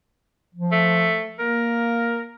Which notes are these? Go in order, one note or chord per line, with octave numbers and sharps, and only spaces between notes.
F3
A3
A#3 A#4